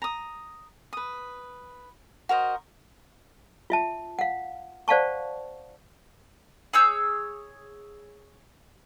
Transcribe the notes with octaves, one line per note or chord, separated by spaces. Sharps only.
A#5 D#6
B4 D#6
F#4 A#4 C5 D#5
F4 E5 A5
F5 F#5
C5 D5 F5 F#5 A5 C#6
G#4 C#5 E6 G6